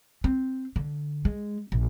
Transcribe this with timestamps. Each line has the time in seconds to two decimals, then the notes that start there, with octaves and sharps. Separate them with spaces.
0.24 C4
0.76 D3
1.25 G#3
1.72 A#1